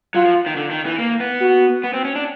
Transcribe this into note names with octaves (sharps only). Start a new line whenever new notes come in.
F#3 F4
F3
D#3
D3
D#3
E3
A#3
B3
F#4
B3
C4
C#4
D4